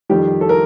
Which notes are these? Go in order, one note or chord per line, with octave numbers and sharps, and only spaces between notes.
F2 D#3 G3 G4
A4
A#4